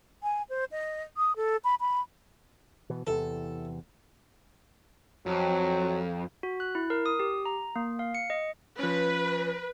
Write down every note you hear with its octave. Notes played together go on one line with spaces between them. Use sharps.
G#5
C5
D#5
D#6
A4
B5
B5
B2 E3
E2 C3 E3 A4
F2 F#3
F#4
F#6
E4
A#4
D#6
G4
A#5
A#3
F5
C#7
D#5
F3 C#4 B4